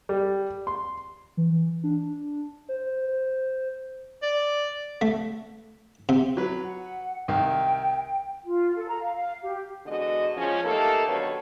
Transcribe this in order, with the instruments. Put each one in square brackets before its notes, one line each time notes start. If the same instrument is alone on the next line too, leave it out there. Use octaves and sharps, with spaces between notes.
[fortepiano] G3
C6
[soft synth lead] E3
D4
C5
C5
[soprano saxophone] D5
[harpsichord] A3
C3
[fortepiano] F#3 B4
[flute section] F#5
[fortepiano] C2 D#3 [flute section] G5
[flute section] F4
A4
A#5
F5
F5
G4
[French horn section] E2 D3 G#3 B3 F#4 D#5
F3 G#3 C#4
A3 A#3 D#4 G4 A4
D#2 D3 F#3 B3 B4 C#5